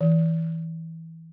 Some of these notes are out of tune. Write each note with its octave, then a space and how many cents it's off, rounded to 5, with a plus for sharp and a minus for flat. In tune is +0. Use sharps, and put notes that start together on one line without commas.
E3 -15